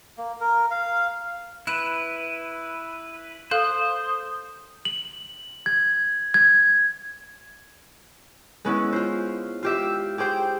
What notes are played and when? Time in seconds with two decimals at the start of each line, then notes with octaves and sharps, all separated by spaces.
0.18 A#3
0.40 A#4
0.71 F5
1.67 E4 B4 F#6 D7 E7
3.51 A4 C5 F5 D#6 F#6
4.85 F#7
5.66 G#6
6.34 G#6
8.65 G#3 B3 C#4 E4
8.92 F4 C5
9.63 F4 G4 E5
10.18 G4 G#4 C5 G5